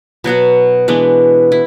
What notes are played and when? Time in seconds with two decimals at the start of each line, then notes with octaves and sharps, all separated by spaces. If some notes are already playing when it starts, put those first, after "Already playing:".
0.24 B2 F#3 B3 F#4
0.88 E3 G#3 B3 D4
1.52 E4